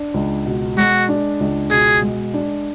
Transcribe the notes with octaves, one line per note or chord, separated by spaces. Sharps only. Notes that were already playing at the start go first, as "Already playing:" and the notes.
Already playing: D4
C#2
B2
G#3 F#4
D4
C#2
B2 G#4
G#3
D4